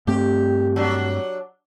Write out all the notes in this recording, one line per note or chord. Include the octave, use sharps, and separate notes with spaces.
G2 A3 C4 G4
F#3 D4